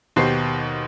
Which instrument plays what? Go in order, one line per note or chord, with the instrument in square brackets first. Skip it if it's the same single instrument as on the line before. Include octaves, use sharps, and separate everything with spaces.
[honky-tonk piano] D#2 B2 G4 C5 C7